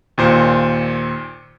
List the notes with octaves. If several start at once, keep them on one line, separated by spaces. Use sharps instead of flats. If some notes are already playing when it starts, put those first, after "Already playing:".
D#2 A#2 C5